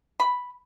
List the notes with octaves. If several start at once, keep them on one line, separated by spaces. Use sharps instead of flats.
B5